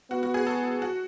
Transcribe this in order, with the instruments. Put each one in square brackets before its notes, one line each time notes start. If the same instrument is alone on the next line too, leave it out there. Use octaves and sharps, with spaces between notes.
[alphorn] B3 [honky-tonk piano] F#4
[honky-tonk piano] F#4
G#4
A4
F#4